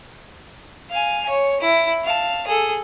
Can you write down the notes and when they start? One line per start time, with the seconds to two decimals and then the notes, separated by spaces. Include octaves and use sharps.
0.90 F5 G#5
1.29 C#5
1.61 E4
2.04 F5 A5
2.47 G#4 A4